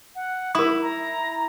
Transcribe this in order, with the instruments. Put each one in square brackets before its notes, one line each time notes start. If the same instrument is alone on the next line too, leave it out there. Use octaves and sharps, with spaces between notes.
[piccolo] F#5
[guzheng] E4 [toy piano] A#4 D#6 [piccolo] B5
[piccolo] A#5